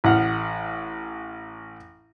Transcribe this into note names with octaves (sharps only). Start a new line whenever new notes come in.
A1 F#5 F6